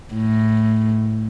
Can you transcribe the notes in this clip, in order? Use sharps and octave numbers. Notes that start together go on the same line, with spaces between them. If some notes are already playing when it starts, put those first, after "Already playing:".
A2